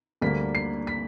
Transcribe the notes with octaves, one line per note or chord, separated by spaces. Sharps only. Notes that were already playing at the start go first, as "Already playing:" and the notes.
D2 D3 G3 A#3 B6
C7
B6